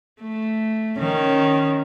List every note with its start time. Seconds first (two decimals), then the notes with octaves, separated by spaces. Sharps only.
0.22 A3
0.98 D#3 C#4